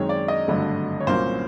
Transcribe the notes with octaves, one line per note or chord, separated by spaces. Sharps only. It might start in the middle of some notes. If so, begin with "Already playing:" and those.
Already playing: F#2 D#3 G#3 C4 D#4 C#5
D5
D#5
G#1 G2 D3 F#3 A3
C#5
C2 A#2 F#3 A#3 C#4 C5